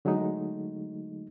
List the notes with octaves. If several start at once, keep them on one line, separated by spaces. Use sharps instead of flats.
D3 F#3 G#3 A3 D#4